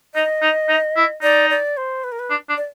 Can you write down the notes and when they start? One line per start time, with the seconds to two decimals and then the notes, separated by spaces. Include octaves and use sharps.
0.15 D#4 D#5
0.42 D#4
0.68 D#4
0.96 E4
1.22 D#4 D5
1.50 D5
1.77 C5
2.04 B4
2.12 A#4
2.19 B4
2.30 D4
2.49 D4
2.57 D5